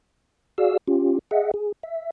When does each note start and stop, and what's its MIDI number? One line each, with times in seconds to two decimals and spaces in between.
0.58 0.77 66
0.58 0.77 68
0.58 0.77 74
0.58 0.77 77
0.58 0.77 88
0.88 1.19 61
0.88 1.19 65
0.88 1.19 67
1.31 1.51 68
1.31 1.51 75
1.31 1.51 76
1.31 1.51 78
1.54 1.72 68
1.83 2.10 76